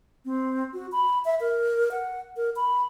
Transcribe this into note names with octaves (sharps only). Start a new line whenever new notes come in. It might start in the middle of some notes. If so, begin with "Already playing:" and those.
C4
F#4
B5
E5
A#4
F#5
A#4
B5